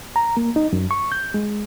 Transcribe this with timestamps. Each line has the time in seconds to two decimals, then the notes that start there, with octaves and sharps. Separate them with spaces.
0.16 A#5
0.37 A#3
0.56 D#4
0.73 F#2
0.91 C#6
1.12 G6
1.34 G#3